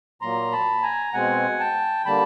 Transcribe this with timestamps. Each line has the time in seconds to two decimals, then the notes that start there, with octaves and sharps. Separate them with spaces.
0.21 A#2 F#3 A#3 A#5 C6
0.52 A5 B5
0.83 G#5 A#5
1.13 B2 G#3 C4 F#5 G#5
1.60 G5 A5
2.06 D3 G3 A#3 A5 B5